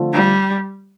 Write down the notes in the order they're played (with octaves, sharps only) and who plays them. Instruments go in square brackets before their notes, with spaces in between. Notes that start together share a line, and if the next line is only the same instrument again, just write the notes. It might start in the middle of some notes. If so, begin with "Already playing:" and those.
Already playing: [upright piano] D3 F3 A3 C4 F4
[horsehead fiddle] G3